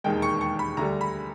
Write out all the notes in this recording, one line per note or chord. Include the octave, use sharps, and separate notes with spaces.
E1 D#2 D#3 G#3 G5
C#6
C#6
B5
D2 D3 G3 A#5
B5